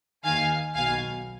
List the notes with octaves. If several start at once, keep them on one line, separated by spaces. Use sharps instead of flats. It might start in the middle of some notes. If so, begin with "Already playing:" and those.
D#2 D#3 F5 G#5
B1 B2 F5 G#5